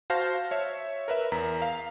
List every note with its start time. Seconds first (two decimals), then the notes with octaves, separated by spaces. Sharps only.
0.10 F#4 C5 F5 A5 F6 A#6
0.51 C#5 E5
1.08 A#4 B4 E5
1.32 E2 A#4 A#5 B6
1.62 F5